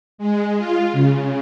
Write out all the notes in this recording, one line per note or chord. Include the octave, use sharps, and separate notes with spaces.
G#3
F4
C#3